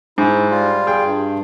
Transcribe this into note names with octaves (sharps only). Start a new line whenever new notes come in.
G#2 E4
G3 F4
G#4 G5
G2